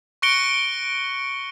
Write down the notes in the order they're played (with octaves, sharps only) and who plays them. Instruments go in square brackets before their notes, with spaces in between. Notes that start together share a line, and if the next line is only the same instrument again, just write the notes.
[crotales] C#6 F#6 A#6 C#7 D7 G7